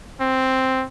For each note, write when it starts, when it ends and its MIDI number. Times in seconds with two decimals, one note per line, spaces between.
0.21 0.86 60